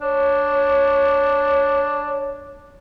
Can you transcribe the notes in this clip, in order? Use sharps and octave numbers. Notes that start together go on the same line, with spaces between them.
D4 C#5